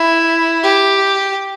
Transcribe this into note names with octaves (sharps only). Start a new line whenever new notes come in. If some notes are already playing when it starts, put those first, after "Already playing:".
Already playing: E4
G4